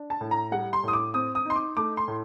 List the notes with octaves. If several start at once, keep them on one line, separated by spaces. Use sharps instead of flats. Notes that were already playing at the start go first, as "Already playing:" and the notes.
Already playing: D4
A5
A2
A#5
G3 F#5
C6
A2 D#6
D6
C4 D#6
D#6
D#4 C6
D6
A3 D6
C6
A2